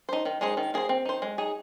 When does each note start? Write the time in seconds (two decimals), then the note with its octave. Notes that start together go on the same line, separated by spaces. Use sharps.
0.09 D#4 C5
0.25 D#3
0.41 G#3 D#4 G#4 C5
0.57 D#3
0.74 A#3 G#4 C5
0.89 C4
1.05 D#4 C5
1.22 G#3
1.38 D#4 G#4